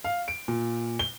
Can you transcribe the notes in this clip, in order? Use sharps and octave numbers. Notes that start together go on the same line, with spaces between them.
F5
D7
A#2
G7